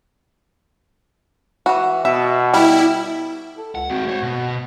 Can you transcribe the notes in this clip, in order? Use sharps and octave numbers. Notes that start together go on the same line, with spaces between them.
E3 F#4
B2 E5
G3 E4
A4
C#2 F#5
G#3 C4 F#4
C5 C#5
B2